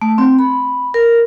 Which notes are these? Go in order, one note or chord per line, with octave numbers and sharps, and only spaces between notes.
A3
C4
B5
A#4